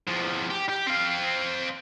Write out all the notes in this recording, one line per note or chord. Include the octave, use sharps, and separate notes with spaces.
E2 F3
G4
G4
C4 F5